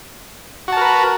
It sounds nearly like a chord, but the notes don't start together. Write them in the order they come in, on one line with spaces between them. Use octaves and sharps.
F#4 A5 A#4 B4